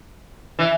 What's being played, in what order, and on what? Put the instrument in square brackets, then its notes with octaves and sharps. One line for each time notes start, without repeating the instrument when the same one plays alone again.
[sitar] E3